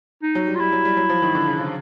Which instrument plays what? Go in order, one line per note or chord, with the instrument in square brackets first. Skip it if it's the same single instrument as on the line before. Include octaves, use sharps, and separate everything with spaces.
[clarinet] D#4
[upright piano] F#3
G3
[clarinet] F4
[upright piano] G3 [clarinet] E4
[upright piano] F#3
G3
F#3
F3
D#3
D3
C#3
C#3